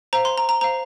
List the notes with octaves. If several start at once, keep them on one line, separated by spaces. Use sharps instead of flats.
C5 F5 A#5
C6
A#5
A#5
C5 F5 A#5